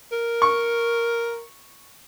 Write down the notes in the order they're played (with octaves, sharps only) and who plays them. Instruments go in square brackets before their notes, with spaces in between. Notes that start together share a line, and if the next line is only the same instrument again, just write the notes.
[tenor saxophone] A#4
[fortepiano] C#6